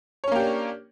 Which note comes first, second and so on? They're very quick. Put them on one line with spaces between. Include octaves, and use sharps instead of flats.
C#5 C#4 A#3 G4 D4